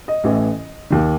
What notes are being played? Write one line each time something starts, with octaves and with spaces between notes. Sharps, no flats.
D#5
A1 A2 E3
D#2 D#3